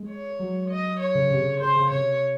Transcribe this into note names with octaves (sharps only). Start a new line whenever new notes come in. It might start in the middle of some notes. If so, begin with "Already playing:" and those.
Already playing: G#3
C#5
F#3
D#5
C#5
C#3
C3
C#3
C#3 C5
C#3
C3 C#5